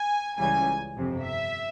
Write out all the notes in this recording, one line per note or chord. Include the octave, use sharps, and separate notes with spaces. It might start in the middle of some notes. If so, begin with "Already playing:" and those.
Already playing: G#5
C#2 C#3 E3 G3 G#5
G1 F2 C3 F3
E5